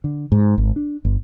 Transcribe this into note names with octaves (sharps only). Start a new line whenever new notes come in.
D3
G#2
G#1
D4
G1